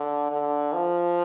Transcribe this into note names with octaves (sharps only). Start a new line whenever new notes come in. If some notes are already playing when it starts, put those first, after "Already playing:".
Already playing: D3
D3
F3